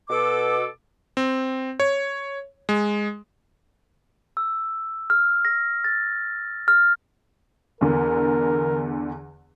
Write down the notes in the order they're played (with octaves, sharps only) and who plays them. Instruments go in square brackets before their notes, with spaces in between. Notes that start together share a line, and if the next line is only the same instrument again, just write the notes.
[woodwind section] B2 A4 D6
[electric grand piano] C4
C#5
G#3
[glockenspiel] E6
F6
A#6
A6
F6
[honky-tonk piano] E2 D3 [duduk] A#4